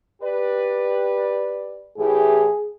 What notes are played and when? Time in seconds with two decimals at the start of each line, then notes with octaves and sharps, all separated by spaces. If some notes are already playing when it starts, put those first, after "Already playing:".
0.22 G4 B4 D5
1.98 A2 E3 G4 G#4